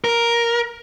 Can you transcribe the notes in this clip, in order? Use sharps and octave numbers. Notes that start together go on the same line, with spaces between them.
A#4